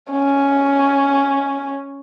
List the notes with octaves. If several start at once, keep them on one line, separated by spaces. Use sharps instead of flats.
C#4